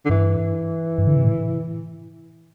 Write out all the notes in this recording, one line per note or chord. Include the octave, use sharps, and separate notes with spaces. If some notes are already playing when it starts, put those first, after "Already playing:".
D3
G2 E3
G2
D3
C3
A2